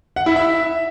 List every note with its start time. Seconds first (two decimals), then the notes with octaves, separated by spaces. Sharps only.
0.16 F#5
0.26 E4
0.36 E5